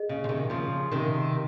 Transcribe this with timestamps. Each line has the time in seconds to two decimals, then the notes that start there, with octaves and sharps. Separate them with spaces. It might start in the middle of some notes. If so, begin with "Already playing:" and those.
Already playing: G#4 D#5
0.09 C#3
0.24 F3
0.29 C3 D#3
0.50 C#3 F3
0.91 C3 D#3